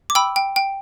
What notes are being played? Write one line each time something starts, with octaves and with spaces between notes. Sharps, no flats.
D6
G5 B5 E6
G5
G5